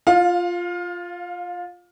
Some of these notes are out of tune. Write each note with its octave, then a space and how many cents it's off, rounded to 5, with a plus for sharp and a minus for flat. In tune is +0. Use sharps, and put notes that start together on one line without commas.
F4 +0 F5 +25